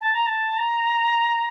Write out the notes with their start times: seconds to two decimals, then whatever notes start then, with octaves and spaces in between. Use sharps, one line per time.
0.01 A5
0.14 A#5
0.26 A5
0.57 A#5